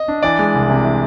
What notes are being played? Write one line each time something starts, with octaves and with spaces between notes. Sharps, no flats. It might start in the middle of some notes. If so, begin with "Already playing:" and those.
Already playing: D#5
D4
E3 D5
G#3
C2
C3
E3